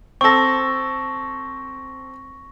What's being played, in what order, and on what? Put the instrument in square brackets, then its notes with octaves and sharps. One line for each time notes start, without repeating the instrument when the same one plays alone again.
[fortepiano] C4 A4 [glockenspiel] C#6 A#6